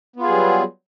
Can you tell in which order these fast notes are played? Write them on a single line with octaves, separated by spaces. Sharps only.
B3 F4 G#4 G3 F#3